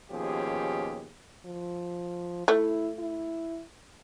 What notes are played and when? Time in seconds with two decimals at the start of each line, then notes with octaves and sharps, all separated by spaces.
0.12 D#2 B2 F3 C#4 G4 G#4
1.46 F3
2.48 A3 E4
2.99 E4